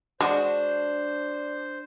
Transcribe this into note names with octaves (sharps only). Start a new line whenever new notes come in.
G#3 D4 F#4 C5